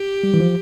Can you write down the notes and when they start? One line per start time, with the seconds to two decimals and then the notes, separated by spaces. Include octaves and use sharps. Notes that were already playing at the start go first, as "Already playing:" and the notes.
Already playing: G4
0.23 G3
0.34 E3
0.40 F3